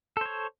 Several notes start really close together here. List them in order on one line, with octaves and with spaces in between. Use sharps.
A4 C5 C#5